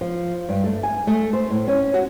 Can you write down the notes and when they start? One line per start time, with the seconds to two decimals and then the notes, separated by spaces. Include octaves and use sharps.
0.01 F3
0.49 G2
0.64 A3
0.83 G#5
1.07 A3
1.33 C5
1.51 A2
1.68 C#4
1.94 F#4